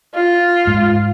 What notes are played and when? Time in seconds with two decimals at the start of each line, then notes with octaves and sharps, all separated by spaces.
0.15 F4
0.67 G#2